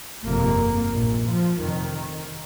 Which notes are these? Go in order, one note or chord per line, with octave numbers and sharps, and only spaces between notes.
G1 F2 C3 A#3
A#1 A#2
F3
F1 F2 C3 D#3